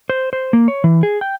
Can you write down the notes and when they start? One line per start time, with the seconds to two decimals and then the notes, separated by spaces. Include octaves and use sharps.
0.10 C5
0.33 C5
0.53 A#3
0.68 C#5
0.84 E3
1.03 G#4
1.21 G5